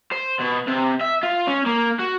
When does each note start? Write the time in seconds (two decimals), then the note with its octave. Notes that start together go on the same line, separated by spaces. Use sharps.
0.12 C5
0.39 B2
0.67 C3
1.01 E5
1.23 F4
1.47 C#4
1.66 A#3
1.99 F#4